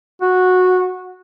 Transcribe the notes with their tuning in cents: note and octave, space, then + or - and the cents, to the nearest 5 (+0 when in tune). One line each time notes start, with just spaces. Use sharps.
F#4 -10